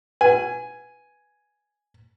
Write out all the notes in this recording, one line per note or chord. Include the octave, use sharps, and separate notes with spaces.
B4 F#5 G#5